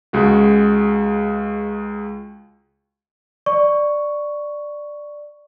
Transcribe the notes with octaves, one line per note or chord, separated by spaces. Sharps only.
C#2 G#3 F#4
D5 C#6